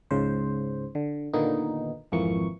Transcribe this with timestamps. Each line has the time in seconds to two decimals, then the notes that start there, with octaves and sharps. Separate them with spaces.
0.11 C#2 G#2 C#3 C5
0.95 D3
1.33 A#2 D3 D#3 A#3 B3 D#4
2.12 G#1 F2 E3 F3 A#3 C#6